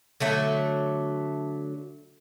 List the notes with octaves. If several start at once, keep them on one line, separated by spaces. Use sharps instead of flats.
D3 F#3 A3